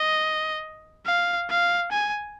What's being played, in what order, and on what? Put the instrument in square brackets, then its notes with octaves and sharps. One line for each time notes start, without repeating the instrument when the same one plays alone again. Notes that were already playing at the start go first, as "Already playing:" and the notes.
Already playing: [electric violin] D#5
F5
F5
G#5